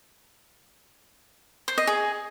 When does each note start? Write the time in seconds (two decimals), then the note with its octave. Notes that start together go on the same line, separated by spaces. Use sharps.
1.68 C5
1.78 D#5
1.87 G#4